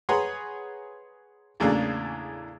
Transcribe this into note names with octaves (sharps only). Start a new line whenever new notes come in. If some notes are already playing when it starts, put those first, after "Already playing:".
G#4 B4 C#5 F#5 A#5 C6
E2 A2 C#3 A#3 D4